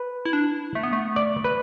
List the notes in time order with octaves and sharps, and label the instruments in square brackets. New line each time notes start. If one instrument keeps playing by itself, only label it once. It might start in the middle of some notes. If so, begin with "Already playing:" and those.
Already playing: [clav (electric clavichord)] B4
[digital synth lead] E4
D4
A3
B3
A3
[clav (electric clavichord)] D5
B4